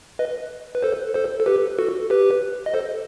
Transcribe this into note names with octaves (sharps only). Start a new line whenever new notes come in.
B4 D#5
B4
A4 C5
A4 C5
A4
G4 B4
F#4 A4
G4 B4
D#5
A4 C5